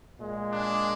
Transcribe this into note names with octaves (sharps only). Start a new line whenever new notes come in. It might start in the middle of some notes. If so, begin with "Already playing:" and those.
A#2 G#3
D4